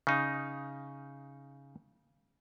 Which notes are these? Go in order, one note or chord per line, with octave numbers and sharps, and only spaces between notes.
C#3 D#4